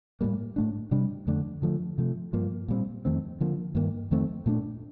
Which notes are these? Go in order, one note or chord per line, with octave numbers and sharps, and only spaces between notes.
A2 G3 A#3
A2 A3 D4
C3 G3 D4
F2 D3 A3 D4
D3 F3 A3
C3 F3 A3
G2 F3 A#3
A#2 G3 C4
F2 D#3 A3 C4
D3 F3 A#3
G2 D#3 A#3
F2 D#3 A3 C4
A#2 A3 D4